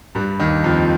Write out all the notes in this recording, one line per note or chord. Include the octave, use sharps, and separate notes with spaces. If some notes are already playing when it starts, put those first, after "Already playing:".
G2 G3
D#2 D#3
F2 F3